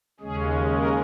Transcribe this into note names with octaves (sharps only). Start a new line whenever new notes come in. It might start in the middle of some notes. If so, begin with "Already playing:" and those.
D#2 C#3 G#3 C#4 G#4
A#4